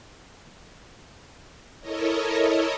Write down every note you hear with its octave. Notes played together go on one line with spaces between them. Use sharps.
E4 A4 A#4 C#5 D#5